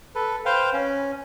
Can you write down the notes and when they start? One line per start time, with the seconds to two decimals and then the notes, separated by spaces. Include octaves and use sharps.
0.15 A4 B4
0.45 B4 C5 F5 G5
0.73 C#4